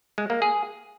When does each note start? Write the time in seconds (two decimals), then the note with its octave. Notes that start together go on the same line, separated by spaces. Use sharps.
0.18 G#3
0.30 A#3
0.42 G#4